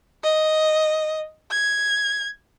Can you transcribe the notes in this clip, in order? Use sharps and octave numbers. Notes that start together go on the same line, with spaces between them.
D#5
G#6